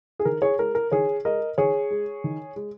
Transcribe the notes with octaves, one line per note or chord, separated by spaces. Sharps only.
G#4
D#3 A#4
G#4 C#5
G#3 A#4
A#4
D#3 G#4 C#5
G#3 A#4 D#5
D#3 G#4 C#5
G#3
D#3
G#3